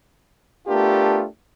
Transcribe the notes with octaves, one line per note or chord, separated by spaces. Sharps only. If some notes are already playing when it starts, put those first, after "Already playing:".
A3 B3 D4 F4 G4 A#4